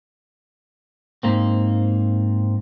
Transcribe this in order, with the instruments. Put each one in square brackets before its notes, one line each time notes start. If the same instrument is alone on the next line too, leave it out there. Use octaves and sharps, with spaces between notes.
[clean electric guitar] G#2 A#3 C4